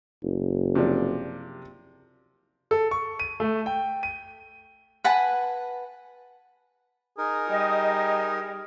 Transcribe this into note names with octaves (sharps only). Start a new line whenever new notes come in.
F#1
C3 F3 D4
A4
C#6
D#7
A3
G5
D#7
B4 F#5 G#5 A5
D#4 G#4 A#4
G3 D#5